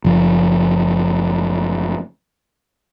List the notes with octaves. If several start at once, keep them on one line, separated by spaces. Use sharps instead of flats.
F#1 F3